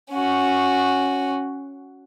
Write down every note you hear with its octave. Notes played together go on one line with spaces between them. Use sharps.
C#4 F#4